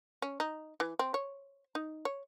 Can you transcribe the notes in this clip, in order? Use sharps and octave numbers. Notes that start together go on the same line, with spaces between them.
C#4
D#4
E3
C4
C#5
D#4
C#5